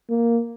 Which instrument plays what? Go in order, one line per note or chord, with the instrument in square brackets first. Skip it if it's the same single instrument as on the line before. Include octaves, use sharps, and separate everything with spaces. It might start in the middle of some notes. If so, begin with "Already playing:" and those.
[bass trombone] A#3